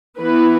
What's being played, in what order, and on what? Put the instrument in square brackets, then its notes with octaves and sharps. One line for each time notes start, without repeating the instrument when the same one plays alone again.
[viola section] E3 B3 E4 B4